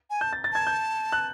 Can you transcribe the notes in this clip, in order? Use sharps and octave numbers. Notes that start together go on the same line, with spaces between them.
G#5
A5 G6
A6
A6
A5 G#6
G6
F#6